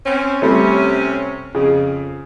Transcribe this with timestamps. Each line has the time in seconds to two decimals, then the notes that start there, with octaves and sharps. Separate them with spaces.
0.05 C4 C#4
0.42 C3 G3 A3 C4 C#4
1.55 F2 C#3